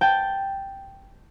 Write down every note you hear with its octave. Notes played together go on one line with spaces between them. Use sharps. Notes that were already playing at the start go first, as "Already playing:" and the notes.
G5 A5 G6